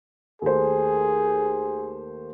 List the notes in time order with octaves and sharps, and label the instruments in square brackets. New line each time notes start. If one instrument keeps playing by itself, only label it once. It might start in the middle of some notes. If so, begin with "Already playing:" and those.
[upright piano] D#2 A3 C5 [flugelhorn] G#4